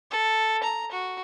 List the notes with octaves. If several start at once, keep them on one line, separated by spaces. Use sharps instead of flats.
A4
A#5
F#4